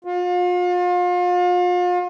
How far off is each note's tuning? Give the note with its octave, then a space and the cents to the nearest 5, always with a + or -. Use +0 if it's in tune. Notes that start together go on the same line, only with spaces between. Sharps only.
F4 +40